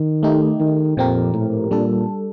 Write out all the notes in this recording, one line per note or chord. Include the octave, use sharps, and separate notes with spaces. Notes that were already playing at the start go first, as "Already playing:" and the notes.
Already playing: D#3
A3 D#4 G4
D#3
F2 A#2 F3 C4 G4 A#4
A2
A#2 G3 D4 A4